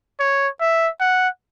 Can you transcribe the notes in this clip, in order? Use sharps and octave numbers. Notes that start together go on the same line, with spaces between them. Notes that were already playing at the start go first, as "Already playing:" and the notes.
C#5
E5
F#5